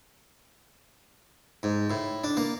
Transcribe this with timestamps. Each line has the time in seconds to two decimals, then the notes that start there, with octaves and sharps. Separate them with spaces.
1.63 G#2
1.90 A2
2.24 D4
2.37 A#3